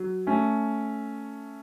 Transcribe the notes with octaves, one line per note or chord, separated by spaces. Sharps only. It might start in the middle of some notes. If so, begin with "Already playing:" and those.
Already playing: F#3
A3 C#4